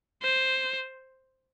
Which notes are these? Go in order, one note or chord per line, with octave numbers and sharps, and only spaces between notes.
C5